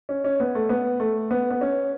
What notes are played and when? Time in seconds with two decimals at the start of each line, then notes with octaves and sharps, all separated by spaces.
0.09 C#4
0.24 C#4
0.40 B3
0.55 A3
0.69 B3
1.00 A3
1.31 B3
1.51 B3
1.61 C#4